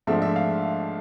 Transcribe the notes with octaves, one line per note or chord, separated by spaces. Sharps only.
G#2 F3 A3 D4 E5
E5
F5